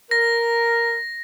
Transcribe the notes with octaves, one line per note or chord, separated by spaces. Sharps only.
A#4 A#6